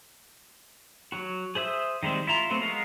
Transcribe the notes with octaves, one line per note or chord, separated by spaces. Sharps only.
F#3 F#4
G#4 C5 E5 D#6 E6
D#3 G3 G#3 C4
E4 F4 A#5
F#3 A3 B3 C4
G#3 B3 A#4 F5